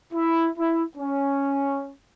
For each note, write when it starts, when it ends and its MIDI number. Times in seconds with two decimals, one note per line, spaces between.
0.13 0.48 64
0.57 0.82 64
0.96 1.92 61